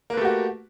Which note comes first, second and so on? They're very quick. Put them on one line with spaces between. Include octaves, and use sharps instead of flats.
A#3 B4 A3 G4 F#4